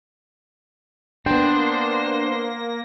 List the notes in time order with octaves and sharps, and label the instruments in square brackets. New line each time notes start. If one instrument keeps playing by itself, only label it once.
[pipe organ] A#3 A#6 [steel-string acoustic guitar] B3 G5 [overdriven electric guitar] D4 [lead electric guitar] C5